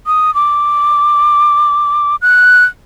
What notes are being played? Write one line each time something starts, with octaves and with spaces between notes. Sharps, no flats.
D#6
D6
F#6